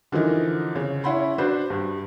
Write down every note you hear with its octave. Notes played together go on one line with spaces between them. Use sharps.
D3 E3 F3 D#4 A#4
C#3
C#4 E4 F#5 B5 C6
D4 F#4 B4 C5
G2